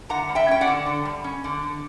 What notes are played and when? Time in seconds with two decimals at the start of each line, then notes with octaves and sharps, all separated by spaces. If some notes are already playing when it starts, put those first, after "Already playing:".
0.09 D3 F#5 A#5
0.29 G3
0.35 E5 G5
0.48 C#4 G5
0.61 D5 F#5
0.67 D3
0.86 D3
1.05 G3
1.24 C#4
1.44 D3
1.63 D3